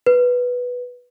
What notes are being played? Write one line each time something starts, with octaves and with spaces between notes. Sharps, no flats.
B4